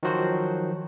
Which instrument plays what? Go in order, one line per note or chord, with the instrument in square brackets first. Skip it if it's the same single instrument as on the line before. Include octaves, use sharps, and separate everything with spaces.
[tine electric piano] D#3 F3 F#3 F#4 C5